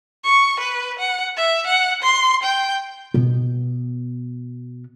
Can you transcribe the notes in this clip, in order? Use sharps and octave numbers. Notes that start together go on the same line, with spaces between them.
C#6
B4
F#5
E5
F#5
C6
G5
B2 B3